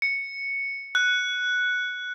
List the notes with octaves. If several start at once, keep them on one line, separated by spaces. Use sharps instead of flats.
C#7
F#6